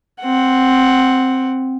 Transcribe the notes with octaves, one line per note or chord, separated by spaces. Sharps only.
C4 F#5